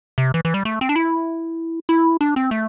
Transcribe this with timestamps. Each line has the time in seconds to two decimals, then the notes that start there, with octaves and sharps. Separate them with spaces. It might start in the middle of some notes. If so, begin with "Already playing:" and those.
0.18 C3
0.34 E3
0.45 E3
0.54 G3
0.65 A3
0.81 C4
0.89 D4
0.96 E4
1.89 E4
2.21 D4
2.36 C4
2.51 A3